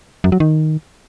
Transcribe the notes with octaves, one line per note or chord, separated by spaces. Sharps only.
F#2
F#3
D#3